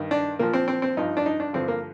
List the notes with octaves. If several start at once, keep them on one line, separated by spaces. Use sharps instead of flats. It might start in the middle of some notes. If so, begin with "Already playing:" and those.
Already playing: G2 D#3
D4
A#2 F3 A#3
C4
C4
C4
G2 F3 D#4
D4
D#4
D4
G2 D3 F3 C4
A#3